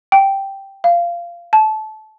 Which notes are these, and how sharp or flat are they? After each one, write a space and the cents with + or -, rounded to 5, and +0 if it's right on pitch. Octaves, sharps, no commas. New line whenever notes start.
G5 -5
F5 -20
A5 -25